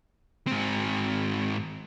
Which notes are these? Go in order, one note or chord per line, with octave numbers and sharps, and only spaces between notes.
G#2 C4